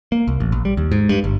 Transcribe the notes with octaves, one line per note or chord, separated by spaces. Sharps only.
A#3
C2
A1
A#1
G3
D#2
G#2
G2
G1